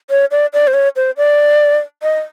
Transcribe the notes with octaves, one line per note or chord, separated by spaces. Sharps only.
C#5
D5
D5
C5
C#5
C5
D5
D#5